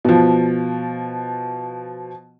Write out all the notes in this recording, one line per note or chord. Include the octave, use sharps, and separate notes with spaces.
B2 F3